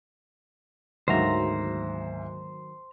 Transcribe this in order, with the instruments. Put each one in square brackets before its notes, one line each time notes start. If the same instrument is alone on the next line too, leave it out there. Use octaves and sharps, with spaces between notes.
[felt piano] D2 G#2 E5 [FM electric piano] D#3 F#3 A#3 [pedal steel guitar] C5 A#5